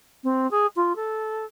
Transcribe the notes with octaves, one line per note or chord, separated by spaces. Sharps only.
C4
G#4
F4
A4